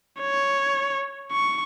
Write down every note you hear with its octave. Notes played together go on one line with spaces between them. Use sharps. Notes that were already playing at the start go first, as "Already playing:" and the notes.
C#5
C#6